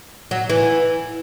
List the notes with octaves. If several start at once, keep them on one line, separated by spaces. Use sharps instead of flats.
F#3
E3